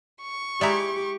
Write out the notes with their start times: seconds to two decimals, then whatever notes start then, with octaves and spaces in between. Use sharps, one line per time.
0.22 C#6
0.61 G#3 D#4 E4 G4 D5 E5 A#5